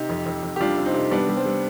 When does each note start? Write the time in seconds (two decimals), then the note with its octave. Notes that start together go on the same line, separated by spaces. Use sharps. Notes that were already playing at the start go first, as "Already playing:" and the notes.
Already playing: C3 D#4 G4
0.09 F2
0.26 F2
0.43 F2
0.56 G4
0.61 G3 D4 F4
0.77 C3
0.86 C4 D#4
0.94 C3
1.11 G3 B3 D4
1.29 G3
1.37 C4
1.45 G3